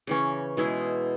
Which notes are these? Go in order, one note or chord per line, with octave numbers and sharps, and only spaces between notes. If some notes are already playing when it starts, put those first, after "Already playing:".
C#3 E3 C#4
B2 G#3 E4 G#4